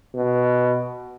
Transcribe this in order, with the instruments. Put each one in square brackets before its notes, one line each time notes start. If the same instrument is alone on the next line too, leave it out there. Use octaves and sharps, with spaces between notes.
[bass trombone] B2